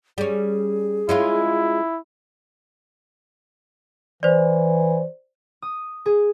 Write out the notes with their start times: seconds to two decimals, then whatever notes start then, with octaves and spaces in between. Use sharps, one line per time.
0.18 G3 C#4 G#4
1.09 G#3 C#4 E4 F4
4.23 E3 C5 D5
5.62 D#6
6.06 G#4